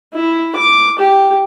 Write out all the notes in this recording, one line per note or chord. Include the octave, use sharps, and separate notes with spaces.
E4
D6
G4